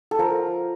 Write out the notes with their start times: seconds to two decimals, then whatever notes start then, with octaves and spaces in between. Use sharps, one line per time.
0.11 A4
0.19 F3 A#4